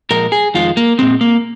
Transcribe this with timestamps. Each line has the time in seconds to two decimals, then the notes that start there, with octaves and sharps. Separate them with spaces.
0.10 A#2 F3 G#3 A#4
0.32 G#4
0.54 F2 D#3 G#3 F4
0.77 A#3
0.99 A#2 G#3 C4
1.21 A#3